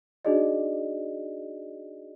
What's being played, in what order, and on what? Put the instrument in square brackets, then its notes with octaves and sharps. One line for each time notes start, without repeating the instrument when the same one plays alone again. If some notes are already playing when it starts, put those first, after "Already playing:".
[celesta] D4 D#4 F#4 G#4 D5 D#5